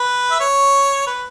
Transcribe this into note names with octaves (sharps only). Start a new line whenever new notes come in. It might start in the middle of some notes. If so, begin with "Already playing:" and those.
Already playing: B4
E5
C#5
B4